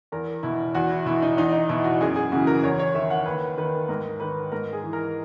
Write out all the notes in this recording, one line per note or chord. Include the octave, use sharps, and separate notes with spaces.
E2 A#4
B2 E4
E2 F#4
E4
B2 E4
D#4
E2 D#4
D#4
B2 E4
F#4
F#2 G#4
G#4
C#3 E3 F#4
A#4
E2 C#5
C#5
D#3 E5
F#5
D#2 B4
D#3 B4
G#2 A#4
D#3 B4
G#2 A#4
G#4
E3
A#4